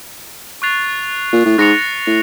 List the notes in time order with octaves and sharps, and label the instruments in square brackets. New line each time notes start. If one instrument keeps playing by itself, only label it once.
[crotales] C#6 F#6 A6 C7 F7
[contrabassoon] A#2
A2
[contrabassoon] G#2 [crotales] F#6 A#6 C#7 F7
[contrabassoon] A2